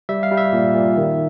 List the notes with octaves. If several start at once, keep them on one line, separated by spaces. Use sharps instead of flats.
G3 E5
F5
G3
E5
A#2
A#2
D#3